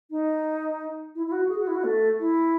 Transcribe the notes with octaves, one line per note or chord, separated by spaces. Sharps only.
D#4
E4
E4
F#4
G#4
F#4
E4
F#4
A3
E4